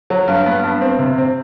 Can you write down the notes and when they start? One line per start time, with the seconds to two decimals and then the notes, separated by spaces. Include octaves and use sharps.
0.10 F#3
0.28 G2
0.46 B3
0.63 G2
0.81 C4
0.99 C3
1.18 C4